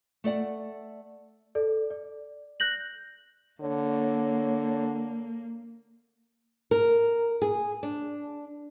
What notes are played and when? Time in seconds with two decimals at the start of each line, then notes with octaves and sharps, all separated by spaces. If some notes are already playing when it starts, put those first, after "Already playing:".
0.24 A3 A4 D5 F#5
1.55 A4 D5
1.90 D5
2.60 F#6 G6 A#6 F#7
3.61 D3 A#3 C#5
6.71 A#4
7.42 G#4
7.83 D4